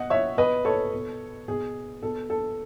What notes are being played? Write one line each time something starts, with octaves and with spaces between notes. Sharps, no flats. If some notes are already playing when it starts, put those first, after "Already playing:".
Already playing: B2 D#5 F#5
C#5 E5
B2 B4 D#5
A4 C#5
B2
B2 G#4
B2 A4
A4